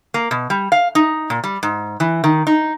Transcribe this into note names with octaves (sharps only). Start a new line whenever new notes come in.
A#3
B2
G3
F5
D#4
A#2
G3
G#2
E3
D#3
D#4